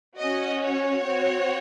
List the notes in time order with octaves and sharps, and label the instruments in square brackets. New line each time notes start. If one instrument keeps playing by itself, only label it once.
[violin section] C#4 F#4 D#5
C#5
C4 F#4